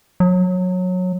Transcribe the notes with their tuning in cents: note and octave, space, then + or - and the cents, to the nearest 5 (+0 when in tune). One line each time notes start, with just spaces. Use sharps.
F#3 -20